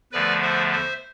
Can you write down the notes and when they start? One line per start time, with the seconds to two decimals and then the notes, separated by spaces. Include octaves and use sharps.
0.12 E2 D3 F3 A3 B4 D5
0.42 C5 E5
0.72 C5 E5